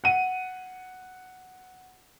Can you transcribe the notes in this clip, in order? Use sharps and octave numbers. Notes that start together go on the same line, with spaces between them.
F#5 D#7